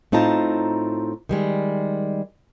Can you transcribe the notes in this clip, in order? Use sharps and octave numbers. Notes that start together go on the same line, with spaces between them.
A2 C4 D#4 F4 A5 A#5
D#3 G3 G#3